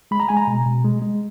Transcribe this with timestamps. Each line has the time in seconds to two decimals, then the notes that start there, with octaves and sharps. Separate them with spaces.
0.11 G#3 B5
0.20 A#5
0.29 G#3 G#5
0.37 A#5
0.47 B2
0.66 B2
0.84 G#3
1.02 G#3